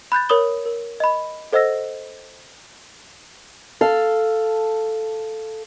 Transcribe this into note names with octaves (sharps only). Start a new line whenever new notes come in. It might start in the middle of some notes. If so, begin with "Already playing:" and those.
B5 F#6 G6 A6
A#4 C#5 B5 D#6 G7
A#4
D#5 B5
A4 C5 D#5 F#5 E6 A#6
A4 F5